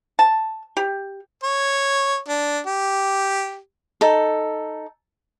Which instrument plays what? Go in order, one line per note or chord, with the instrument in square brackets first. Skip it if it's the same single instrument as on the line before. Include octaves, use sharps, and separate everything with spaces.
[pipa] A5
G4
[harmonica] C#5
D4
G4
[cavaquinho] D#4 A4